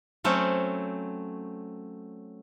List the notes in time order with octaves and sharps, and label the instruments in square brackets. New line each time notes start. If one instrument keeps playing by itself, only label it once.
[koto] F#3 A3 C4 C#4